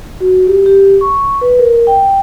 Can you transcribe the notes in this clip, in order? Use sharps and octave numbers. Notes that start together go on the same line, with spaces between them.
F#4
G4
G4
C#6
B4
A#4
G5